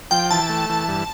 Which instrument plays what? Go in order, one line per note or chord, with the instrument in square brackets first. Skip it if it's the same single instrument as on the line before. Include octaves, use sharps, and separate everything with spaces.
[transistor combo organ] F3 [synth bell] G5
[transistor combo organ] E3 [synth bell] A5
[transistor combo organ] A3
E3
G2